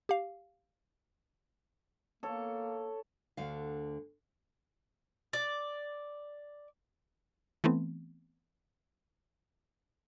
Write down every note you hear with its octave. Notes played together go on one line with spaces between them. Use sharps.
G4 F5
A#3 A4 C#5
D2 D3 F5
D5
E3 A3 B3 C4